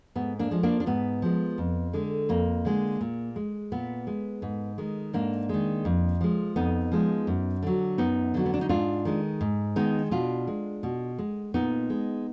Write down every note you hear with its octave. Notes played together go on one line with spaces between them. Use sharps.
G#2 B3
A#3 D4
F3 G#3
A#3 D4
D4
G#2 B3
F3 G#3
F2
D3 G#3
F2 A#3
D3 G#3
A#2
G#3
A#2 B3
G#3
G#2
D#3 G#3
G#2 A#3 D4
D#3 G#3
F2
F3 G#3
F2 B3 D#4
F3 G#3
F#2
D3 F#3
F#2 B3 D#4
D3 F#3
B3
D4
D#4
G#2 D4 F4
D#3 G#3
G#2
D#3 G#3 B3 D#4
B2 D4 F4
G#3
B2
G#3
A#2 B3 D#4
G#3